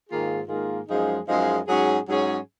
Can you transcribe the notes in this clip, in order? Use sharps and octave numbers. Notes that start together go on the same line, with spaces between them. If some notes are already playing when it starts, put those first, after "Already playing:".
G#2 D#3 A#3 F4 G#4
G#2 D#3 A#3 F4 G#4
F#2 F3 G#3 D#4 G#4
F#2 F3 G#3 D#4 G#4
G#2 F#3 C#4 G#4
G#2 F#3 C#4 G#4